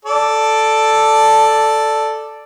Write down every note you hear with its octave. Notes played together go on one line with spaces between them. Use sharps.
A4 D5